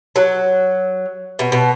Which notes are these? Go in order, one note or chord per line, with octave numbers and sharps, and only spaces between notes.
F#3
B2
B2